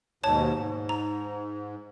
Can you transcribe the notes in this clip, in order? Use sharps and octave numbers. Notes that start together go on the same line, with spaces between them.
D#2 G#2 B2 C#5 A5
G#2
A#5